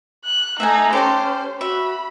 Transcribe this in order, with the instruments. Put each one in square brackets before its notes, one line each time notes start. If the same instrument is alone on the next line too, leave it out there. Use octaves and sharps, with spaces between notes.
[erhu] F#6
[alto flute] A3 [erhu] D#4 [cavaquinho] E5 F#5 G#5
[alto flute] C#4 [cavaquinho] G4 A4 C6 [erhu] C5
[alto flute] F#4 [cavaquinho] E5 [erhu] B5